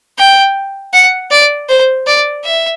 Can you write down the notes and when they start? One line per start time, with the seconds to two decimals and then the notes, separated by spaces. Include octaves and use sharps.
0.18 G5
0.94 F#5
1.31 D5
1.69 C5
2.07 D5
2.45 E5